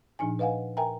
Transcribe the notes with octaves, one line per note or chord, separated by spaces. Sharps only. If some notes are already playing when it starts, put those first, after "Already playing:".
A#2 F3 D4 D#4 G#5
B4 D#5 F5 F#5 G#5
A#4 E5 G5 G#5 A#5